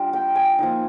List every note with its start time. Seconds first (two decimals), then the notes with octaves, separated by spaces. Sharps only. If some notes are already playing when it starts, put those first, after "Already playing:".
Already playing: G3 D4 F4
0.13 G5
0.35 G#5
0.59 F3 A#3 D#4